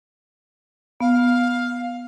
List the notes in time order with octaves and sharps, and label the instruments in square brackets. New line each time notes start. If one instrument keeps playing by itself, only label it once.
[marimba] B3 [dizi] F5